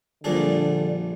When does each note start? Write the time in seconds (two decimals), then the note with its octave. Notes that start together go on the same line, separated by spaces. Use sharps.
0.24 A#1 A#2 D3 G3 D4 G#4